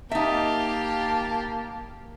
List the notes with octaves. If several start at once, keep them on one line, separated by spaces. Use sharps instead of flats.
A#3 D#4 G4 E5 F5 A5